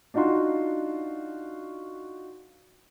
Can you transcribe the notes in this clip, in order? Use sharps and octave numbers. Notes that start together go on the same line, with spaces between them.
D4 D#4 F4 F#4 C6